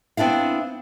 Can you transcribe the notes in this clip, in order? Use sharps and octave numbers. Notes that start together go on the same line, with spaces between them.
B3 C4 D4 E4 F5